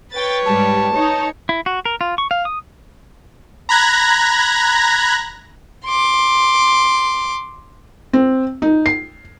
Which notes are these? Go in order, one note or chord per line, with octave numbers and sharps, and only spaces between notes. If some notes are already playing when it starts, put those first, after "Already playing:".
B4 C#5 G5 A6
G#2 G3 A5
D#4 C#5
E4
F#4
A#4
F4
C#6
F5
D#6
A#5 B5 F#6 G#6 A#6
C6 D6
C4
D#4
C7